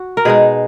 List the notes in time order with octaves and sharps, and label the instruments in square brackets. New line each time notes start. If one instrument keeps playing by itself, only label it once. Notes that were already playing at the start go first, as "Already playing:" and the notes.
Already playing: [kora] F#4
A#4
B2 G#3 D#4 G#4